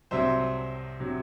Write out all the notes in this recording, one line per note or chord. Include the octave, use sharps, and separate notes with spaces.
C2 C3 F#3 C5 E5
C3 F#3